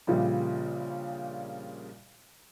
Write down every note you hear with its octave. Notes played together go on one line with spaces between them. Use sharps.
A#1 A#2 C#3 G3